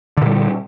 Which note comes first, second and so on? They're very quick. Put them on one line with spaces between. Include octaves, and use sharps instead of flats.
D3 A#2 G3